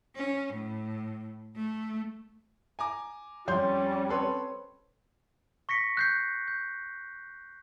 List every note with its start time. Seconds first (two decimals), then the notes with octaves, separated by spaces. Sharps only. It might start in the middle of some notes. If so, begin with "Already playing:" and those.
0.16 C#4
0.54 A2
1.56 A3
2.79 G#5 A#5 D6
3.48 F2 G3 C#4 C#5 C6 G6
4.09 C4 A4 B4 C#5 C6
5.69 C#6 A#6 B6 C#7
5.97 F#6 G6 C7
6.48 G6